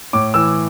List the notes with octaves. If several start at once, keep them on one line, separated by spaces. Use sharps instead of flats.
A2 D6
E3 E6